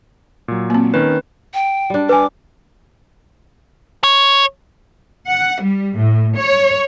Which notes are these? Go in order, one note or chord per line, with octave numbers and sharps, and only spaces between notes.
A#2 F#3
A#3 C4
D#3 C#4 B4
G5
G3 D4
B4 G#5 D6
C#5
F#5
G3
A2
C#5